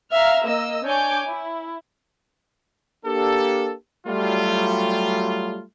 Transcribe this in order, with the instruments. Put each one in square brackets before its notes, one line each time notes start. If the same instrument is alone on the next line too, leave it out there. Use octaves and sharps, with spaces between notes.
[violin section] E5 F5 A#5 F6
A#3 D#5 E6
D4 C#5 G#5 D6 G6
E4
[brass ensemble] A#3 D4 G4 A4
F#3 G3 A3 F4